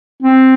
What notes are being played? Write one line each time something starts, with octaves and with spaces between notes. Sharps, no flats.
C4